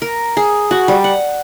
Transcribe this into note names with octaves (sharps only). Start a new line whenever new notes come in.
A#4
G#4
F#4
G3
F#5